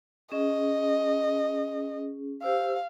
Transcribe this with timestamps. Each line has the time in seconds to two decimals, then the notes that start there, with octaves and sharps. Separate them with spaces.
0.32 C#4 G#4 D#5
2.42 G4 C5 F5 E6